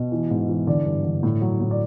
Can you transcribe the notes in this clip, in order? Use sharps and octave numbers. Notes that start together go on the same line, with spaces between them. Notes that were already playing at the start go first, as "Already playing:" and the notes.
Already playing: B2
E3
G#2
E3
D3 D5
G2
D3
A2
F#3
A2
D5